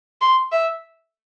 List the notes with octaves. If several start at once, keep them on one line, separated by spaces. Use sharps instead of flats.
C6
E5